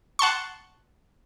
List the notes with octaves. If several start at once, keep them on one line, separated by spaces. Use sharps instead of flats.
F#5 A5 C6 C#6